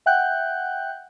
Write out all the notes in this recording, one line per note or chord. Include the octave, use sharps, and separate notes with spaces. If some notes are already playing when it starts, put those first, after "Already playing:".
E5 F#5 G5 F#6 G6